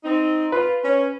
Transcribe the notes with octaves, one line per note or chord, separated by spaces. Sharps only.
C4 D#4
F4 B4
C#4